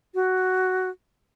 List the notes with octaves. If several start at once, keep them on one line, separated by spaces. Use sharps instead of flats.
F#4